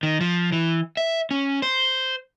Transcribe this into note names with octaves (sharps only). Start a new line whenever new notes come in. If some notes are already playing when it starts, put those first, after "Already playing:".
D#3
F3
E3
E5
C#4
C5